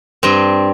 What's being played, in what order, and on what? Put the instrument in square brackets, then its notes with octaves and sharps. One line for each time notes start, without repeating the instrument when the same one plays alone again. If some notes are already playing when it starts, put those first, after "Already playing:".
[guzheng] G2 C4